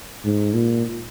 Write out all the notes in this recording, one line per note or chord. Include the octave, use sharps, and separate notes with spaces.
G#2
A#2